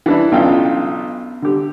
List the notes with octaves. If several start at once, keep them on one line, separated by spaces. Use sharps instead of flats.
E3 D4 E4
B1 C#3 E3 D4 F4 G5
D3 G4